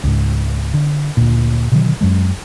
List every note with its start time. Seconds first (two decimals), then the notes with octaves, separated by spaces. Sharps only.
0.04 C#2 G#2
0.74 D3
1.17 D2 A#2
1.72 B2 D3 D#3 F#3
2.01 F#2 F#3 G#3